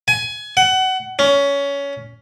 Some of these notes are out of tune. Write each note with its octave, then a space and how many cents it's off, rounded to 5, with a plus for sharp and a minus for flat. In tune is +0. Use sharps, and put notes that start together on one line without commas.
G#5 +20
F#5 +25
C#4 +20